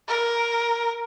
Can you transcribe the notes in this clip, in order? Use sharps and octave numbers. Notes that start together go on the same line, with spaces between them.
A#4